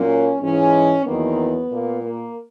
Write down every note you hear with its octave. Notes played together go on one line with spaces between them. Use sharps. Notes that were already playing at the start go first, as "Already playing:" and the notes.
Already playing: A#2 F#3 A#3 C#4
G#2 E3 G#3 C#4
E2 D#3 F#3 A#3 B3
A#2 A#3
A#3